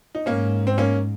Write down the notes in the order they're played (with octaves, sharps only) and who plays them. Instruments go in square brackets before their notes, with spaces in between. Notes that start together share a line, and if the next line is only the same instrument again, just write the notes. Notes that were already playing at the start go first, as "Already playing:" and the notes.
[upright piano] D#4
[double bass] G#2 [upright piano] A#3 C#4
[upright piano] C4
A#3 C#4